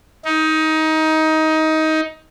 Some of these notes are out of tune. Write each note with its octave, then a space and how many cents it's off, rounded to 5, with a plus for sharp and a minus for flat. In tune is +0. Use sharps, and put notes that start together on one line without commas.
D#4 +20